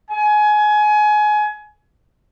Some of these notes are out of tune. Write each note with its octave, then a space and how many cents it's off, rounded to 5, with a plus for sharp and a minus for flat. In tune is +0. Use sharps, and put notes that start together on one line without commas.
G#5 +25